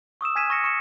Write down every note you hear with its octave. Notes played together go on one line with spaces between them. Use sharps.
C#6 D#6 E6 E7
G#5 F6 G#6 B6 D#7 E7
G#5 C#6 A#6 C#7
C#6 C#7 E7